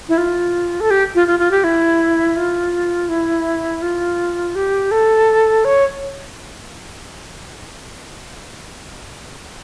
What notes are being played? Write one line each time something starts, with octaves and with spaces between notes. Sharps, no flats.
E4
F4
A4
G4
F4
F4
F4
G4
E4
F4
E4
F4
G4
A4
C#5